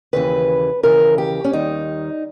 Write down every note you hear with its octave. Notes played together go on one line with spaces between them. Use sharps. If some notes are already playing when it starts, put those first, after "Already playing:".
D#2 C#3 E3 B4
D#2 C#3 E3 A#4
G4
C#4
D#2 D#3 G3 D#4